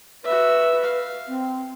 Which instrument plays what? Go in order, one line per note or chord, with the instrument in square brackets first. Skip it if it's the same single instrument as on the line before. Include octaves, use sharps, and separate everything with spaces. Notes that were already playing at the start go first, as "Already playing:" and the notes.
[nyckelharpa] F#4 E5 [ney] B4
[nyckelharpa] F5
[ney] C4